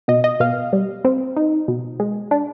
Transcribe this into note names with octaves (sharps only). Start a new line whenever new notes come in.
B2 D#5
D#5
B2 F5
G3
C4
D#4
B2
G#3
D4